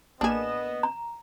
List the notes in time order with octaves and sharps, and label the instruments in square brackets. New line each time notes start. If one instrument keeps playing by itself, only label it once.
[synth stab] A1 A#3 E7 [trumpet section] B3 D#5 [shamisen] D4 G#4
[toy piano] A#5